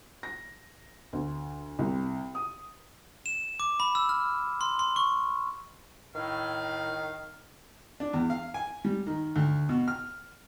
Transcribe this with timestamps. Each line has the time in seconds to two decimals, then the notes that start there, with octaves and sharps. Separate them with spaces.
0.23 A#6
1.13 D2
1.79 C2
2.35 D#6
3.26 E7
3.60 D6
3.80 B5
3.95 E6
4.09 F6
4.61 C6
4.79 C6
4.96 C#6
6.15 A2 D#3 F5
8.00 D4
8.13 E2
8.30 F5
8.54 G#5
8.85 G3
9.07 D#3
9.36 D2
9.69 B2
9.88 F6